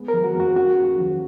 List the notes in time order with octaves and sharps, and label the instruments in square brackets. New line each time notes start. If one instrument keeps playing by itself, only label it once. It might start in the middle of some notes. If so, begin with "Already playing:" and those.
Already playing: [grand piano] G#3 B3
[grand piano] F3 [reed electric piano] A#4
[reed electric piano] F#4
[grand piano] F2
[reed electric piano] F#4
[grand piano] C#3 [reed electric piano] F#4
[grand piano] D#2
F3